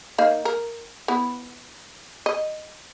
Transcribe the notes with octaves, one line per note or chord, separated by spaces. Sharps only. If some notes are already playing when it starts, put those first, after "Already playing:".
A#3 D#4 F5
A#4
B3 E4
D#5